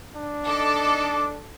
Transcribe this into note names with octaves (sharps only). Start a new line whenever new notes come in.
D4
D#4 A4 D#5 D6